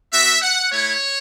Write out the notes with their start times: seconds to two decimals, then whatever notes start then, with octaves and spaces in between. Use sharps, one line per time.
0.11 B3 F#4 E5
0.41 F#5
0.71 A3 E4 C#5